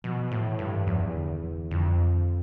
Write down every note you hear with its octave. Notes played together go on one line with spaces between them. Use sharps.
B2 F3
A2 E3
G2 E3
E2 F3
D3
E3
F2 D3
F3